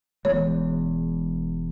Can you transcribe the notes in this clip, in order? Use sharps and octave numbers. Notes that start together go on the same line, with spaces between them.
E1 E2 G#3 C#5